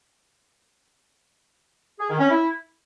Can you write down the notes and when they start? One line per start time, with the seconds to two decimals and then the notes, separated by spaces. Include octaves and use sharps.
2.00 G#4
2.10 D#3
2.20 C#4
2.30 E4